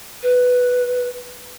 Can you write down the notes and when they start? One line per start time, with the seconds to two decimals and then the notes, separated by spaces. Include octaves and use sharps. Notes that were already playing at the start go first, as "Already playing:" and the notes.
0.22 B4